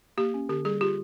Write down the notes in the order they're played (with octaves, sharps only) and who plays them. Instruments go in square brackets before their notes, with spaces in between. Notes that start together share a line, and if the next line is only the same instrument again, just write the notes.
[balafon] A#3 G4
C#4
D3 G4
G3 G#4
F4 G4